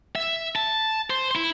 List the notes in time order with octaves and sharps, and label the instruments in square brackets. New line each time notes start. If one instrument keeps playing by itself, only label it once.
[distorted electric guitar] E5
A5
C5
E4